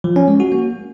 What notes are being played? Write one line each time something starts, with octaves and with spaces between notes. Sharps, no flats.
F3
C#4
G#3
F#4
A#3